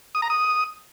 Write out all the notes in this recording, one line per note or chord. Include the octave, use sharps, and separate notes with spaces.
D#6
A#5
D#6